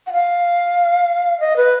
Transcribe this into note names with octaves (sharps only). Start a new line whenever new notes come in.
F#5
F5
D#5
B4